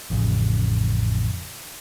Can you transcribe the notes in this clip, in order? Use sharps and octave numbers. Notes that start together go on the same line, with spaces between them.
A1 F2 C#3